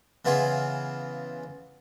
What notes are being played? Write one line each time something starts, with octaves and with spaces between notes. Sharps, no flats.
C#3 E3 B3 F4 G#4